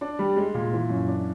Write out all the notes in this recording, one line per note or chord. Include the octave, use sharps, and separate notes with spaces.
D4
G3
G#3
A#2
E3
F#2
D4